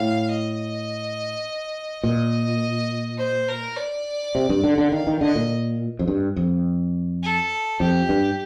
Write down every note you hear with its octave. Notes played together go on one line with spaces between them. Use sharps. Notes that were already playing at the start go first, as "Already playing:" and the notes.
Already playing: A2 F5
D#5
A#2 D#5
C5
A#4
D5
C3
G2
D3
D3
D#3 F5
D#3
D3 D#5
A#2
F2
G2
F2
A4
F2 G4
G2